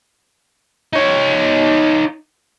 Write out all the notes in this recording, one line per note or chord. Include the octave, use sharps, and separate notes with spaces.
D#4 C#5